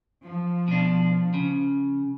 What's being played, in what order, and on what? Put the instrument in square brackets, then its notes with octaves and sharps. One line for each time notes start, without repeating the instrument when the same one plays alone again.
[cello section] F3
[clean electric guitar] B2 D4
C#3